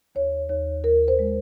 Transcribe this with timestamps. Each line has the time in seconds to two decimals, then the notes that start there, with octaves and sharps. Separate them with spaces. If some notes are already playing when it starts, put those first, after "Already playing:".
0.15 D#2 C#5
0.49 D#2 C#5
0.84 D#2 A#4
1.08 C5
1.19 G#3